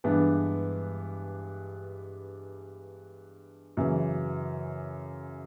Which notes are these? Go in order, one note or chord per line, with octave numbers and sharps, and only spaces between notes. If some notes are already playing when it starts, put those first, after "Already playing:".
G2 E3 G#3 B3 D4
F#2 C#3 E3